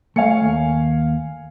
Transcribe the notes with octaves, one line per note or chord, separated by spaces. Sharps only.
A3 C#5 F5 G#5 C#7
D#2